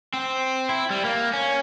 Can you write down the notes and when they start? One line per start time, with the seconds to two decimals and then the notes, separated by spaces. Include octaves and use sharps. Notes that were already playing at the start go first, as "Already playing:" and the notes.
0.14 C4
0.69 E4
0.90 G3
1.05 A#3
1.34 C#4